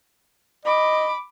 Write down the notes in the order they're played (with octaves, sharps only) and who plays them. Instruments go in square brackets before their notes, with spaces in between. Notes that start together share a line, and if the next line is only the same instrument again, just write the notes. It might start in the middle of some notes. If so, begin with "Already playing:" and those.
[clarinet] D#5 [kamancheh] B5 D6